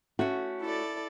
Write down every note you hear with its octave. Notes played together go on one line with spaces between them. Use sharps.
A3 C#4 F#4
E4 A4 D5